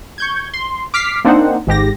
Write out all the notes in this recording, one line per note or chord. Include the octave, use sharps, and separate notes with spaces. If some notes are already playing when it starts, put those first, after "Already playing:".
C#6 G6 G#6
C6
D6 F6 B6 C7
A#3 C4 D4 D#4 C5 F#5
G#1 G#2 G4 A#6